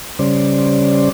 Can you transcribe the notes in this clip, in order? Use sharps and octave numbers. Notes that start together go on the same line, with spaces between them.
C#3 G3 C#4 C5 D5